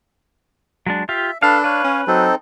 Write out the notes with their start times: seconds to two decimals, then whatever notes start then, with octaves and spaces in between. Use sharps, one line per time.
0.87 F#3 G#3 D4
1.09 F4 G4 E5 F5
1.43 D4 A4 B4 F5
1.64 B4 C#5 F5
1.84 C#4
2.07 F#3 C4 D#4 A4